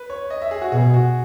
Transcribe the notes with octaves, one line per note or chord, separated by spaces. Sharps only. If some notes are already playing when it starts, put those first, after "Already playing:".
Already playing: B4
C#5
D#5
E5
G#4
F#4
B2 G#4
F#4